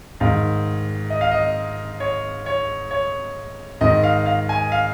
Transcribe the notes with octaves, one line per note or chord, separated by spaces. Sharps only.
G#2 D#3 F5
D#5
F5
D#5
C#5
C#5
C#5
G#2 D#3 D#5
F5
F5
G#5
F5